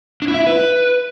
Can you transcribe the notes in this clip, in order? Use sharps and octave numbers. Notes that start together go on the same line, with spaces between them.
D4
E4
E5
E4
B4